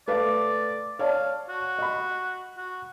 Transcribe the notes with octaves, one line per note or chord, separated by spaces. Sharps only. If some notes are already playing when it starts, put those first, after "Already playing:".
A3 B4 D5 F5
C#5 D5 F5 A5
F#4
D#5 B5
F#4